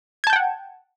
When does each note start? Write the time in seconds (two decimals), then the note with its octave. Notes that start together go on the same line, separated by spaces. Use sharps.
0.24 G#6
0.27 A5
0.30 G6
0.33 G5
0.36 F#5